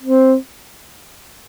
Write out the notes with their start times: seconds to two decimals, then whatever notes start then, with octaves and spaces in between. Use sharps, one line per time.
0.02 C4